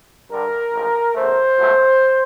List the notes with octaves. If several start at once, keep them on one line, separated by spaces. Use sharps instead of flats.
G2 D3 G3 A#4
A1 G#2 F3
E2 C#3 E3 A3 C5
C#2 B2 F#3 A3